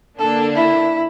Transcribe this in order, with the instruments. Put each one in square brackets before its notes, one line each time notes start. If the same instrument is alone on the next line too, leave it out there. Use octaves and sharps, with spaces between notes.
[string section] D3 A#3 D4 [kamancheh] A4
[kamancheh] E4